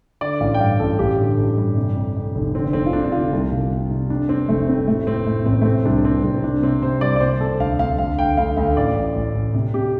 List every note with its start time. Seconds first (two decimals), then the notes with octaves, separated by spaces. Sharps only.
0.21 D3 D5
0.40 A1 F5
0.54 G5
0.60 G2 F5
0.79 A1 A4
0.99 A1 G4
1.18 D3
1.37 A1
1.57 G2
1.76 C3
1.95 F2
2.16 F2
2.35 F1
2.55 D3 C4
2.73 F1 C4
2.86 F4
2.93 F1 D4
3.04 D4
3.12 D3 F4
3.32 C2
3.52 C3
3.71 C3
3.90 C3
4.10 F2 D4
4.29 F2 C4
4.48 F1 A3
4.68 F2 C4
4.87 A2 A3
5.07 A2 C4
5.26 A2 A3
5.46 A1 C4
5.61 A3
5.65 C3 C4
5.85 C2 D4
6.04 C3 C4
6.24 C2 C4
6.43 C3 D4
6.63 C3 C4
6.82 C3 C5
7.01 C2 D5
7.16 D5
7.21 C3 C5
7.40 C3 A4
7.60 D2 F5
7.79 D2 F5
7.99 D2 F5
8.19 D2 G5
8.37 D2 F5
8.57 D2 F5
8.76 A1 D5
8.96 A1
9.15 A1
9.34 A1
9.54 C3
9.74 C3 G4